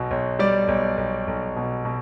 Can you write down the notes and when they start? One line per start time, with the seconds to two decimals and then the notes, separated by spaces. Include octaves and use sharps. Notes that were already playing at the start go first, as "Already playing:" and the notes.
Already playing: B1 B2
0.11 B1
0.39 G3 D5
0.68 B1
0.98 B1
1.27 B1
1.56 B2
1.85 B2